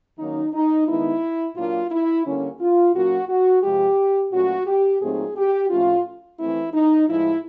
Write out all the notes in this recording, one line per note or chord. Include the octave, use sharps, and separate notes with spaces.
D#3 F#3 A#3 C#4 D#4
D#4
D#3 G#3 B3 D#4 E4
A#2 F#3 A#3 D4 F4
E4
D3 G3 A#3 C#4
F4
A#2 F#3 A#3 C#4 F#4
F#4
C3 F3 G#3 G4
A#2 F#3 A3 C#4 F#4
G4
A#2 F#3 A3 C4 D#4 G#4
G4
A2 F3 A3 C#4 F4
E3 A3 C4 E4
D#4
A2 F3 G#3 E4